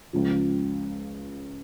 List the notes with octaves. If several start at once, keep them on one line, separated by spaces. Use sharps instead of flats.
C#2 C#3 F3